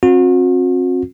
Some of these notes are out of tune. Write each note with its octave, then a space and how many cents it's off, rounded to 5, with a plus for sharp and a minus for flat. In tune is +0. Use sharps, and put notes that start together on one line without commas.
C4 +35 F#4 -40